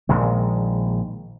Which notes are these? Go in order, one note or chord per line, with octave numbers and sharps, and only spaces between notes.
A#1 A#2 D#3 G#3